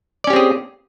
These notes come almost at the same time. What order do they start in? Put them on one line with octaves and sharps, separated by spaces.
D5 C#4 G4 C4 G#4